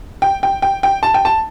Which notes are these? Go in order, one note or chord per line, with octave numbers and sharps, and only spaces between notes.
G5
G5
G5
G5
A5
G5
A5